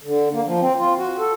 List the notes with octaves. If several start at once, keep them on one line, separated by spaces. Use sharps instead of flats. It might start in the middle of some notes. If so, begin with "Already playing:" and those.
D3
A#3
F3
C4
F4
F#4
A4